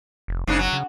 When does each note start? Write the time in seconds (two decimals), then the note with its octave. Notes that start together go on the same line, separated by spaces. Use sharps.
0.28 F1
0.47 F#1 G#2 C#3 D4
0.59 F#3
0.73 C#3